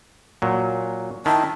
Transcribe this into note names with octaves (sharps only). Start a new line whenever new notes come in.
A#2 F#3
D#3 E4 A5